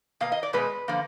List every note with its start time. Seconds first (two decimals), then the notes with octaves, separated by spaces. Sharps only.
0.21 B2 A#3 F5
0.32 D#5
0.43 D5
0.53 B2 G#3 B3 B4
0.88 D3 F3 A#3